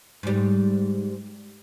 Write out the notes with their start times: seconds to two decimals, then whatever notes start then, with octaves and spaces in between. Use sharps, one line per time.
0.23 G#2 G3